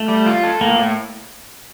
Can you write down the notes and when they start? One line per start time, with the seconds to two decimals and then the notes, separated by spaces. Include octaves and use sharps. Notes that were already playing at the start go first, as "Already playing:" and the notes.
Already playing: A3
0.08 G3
0.26 F4
0.43 A4
0.61 A2 A#3
0.79 A2